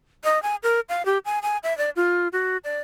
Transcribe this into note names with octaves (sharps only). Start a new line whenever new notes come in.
D#5
G#5
A#4
F5
G4
G#5
G#5
E5
D5
F4
F#4
D5